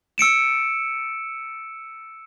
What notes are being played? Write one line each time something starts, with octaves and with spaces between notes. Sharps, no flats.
E6 C#7 D7 E7